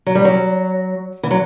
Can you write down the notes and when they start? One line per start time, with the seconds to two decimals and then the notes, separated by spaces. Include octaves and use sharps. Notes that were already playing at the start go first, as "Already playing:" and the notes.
0.07 F#3
0.15 G3
0.25 F#3
1.23 E3
1.31 F#3